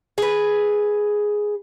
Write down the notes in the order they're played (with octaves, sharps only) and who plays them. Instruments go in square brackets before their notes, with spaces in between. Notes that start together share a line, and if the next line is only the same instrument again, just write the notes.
[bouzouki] G#4 B4